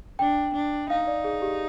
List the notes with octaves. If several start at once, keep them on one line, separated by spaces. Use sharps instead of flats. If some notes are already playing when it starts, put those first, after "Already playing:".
D4 G5
D4
D#4 F5
D5
G#4
G4